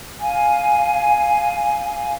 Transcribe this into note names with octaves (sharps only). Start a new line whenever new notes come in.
F5 G#5